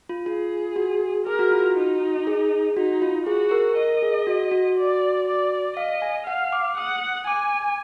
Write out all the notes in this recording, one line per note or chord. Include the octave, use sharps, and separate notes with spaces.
F4
F4 G#4
F#4
G#4 A#4
F#4
F4
F#4
D#4
G#4
D#4 F#4
F4
F#4 G#4
A#4
A#4 D#5
G#4
F#4
F#4
D5
D5
D#5 F5
G#5
F5 F#5
D6
F#5 D#6
G#5 D6